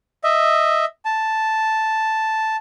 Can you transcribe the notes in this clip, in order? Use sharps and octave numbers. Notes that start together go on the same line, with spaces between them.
D#5 E5
A5